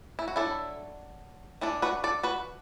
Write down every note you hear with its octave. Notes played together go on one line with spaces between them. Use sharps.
E4
F#4
F#3 D4 E4 A4
E3 D4 E4 A4
F#4 B4
A4 D5
F#4 B4